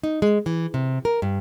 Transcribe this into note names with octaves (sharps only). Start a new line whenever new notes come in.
D#4
G#3
E3
C3
A#4
G2